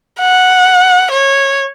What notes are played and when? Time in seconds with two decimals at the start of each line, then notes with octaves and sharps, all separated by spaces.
0.20 F#5
1.11 C#5